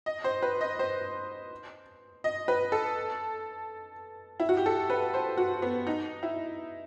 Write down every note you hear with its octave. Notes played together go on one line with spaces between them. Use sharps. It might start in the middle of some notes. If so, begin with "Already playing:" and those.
D#5
C5
B4
D#5
C5
D#5
B4
A4
E4
F#4
G4
A4
B4
C5
F#4
B3
D#4
E4